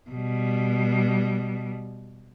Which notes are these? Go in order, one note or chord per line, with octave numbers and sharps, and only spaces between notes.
B2 G3